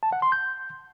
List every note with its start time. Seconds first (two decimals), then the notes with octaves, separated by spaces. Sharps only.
0.03 A5
0.12 F#5
0.22 C6
0.32 G6